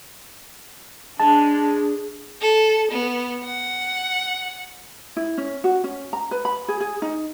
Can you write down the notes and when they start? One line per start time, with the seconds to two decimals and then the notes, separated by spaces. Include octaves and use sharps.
1.19 G#3 D4 A5
2.41 A4
2.91 B3
3.44 F#5
5.16 E4
5.38 C#4
5.64 F#4
5.84 C#4
6.13 A#5
6.31 B4
6.45 B5
6.68 G#4
6.80 G#4
7.02 D#4